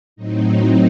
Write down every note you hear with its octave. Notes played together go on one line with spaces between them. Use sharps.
A2 F#3 C4 D#4